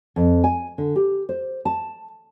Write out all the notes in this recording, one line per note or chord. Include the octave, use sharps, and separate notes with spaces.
F2
G#5
D3
G4
C5
A5